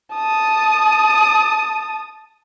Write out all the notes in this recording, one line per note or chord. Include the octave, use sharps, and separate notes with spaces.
A5 D#6